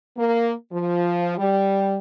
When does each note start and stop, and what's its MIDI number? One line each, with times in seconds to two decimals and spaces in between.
0.16 0.52 58
0.72 1.34 53
1.37 1.98 55